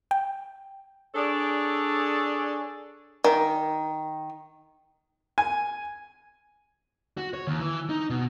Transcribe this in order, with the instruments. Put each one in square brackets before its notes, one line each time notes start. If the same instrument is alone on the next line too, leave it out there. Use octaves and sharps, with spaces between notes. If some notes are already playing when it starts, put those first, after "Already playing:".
[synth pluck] G5
[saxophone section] D4 G#4 A4 C#5 D5
[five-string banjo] D#3
[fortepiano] G#5
[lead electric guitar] F#4
C#5
D#2
E3
D#4
B2